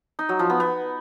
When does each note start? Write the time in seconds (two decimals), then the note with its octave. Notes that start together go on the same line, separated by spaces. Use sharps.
0.19 D#4
0.29 F#3
0.39 F3
0.50 B3
0.60 B3